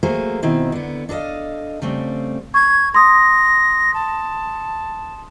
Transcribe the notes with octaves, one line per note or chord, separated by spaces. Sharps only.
F#3 A3 A#3 G#4 C5
B2 D#3 C4 E4
D3 B3
D4 A4 A#4 D#5 F5
C#3 G3 A3 C4
C#6 G#6
C6 D#6 A#6
A5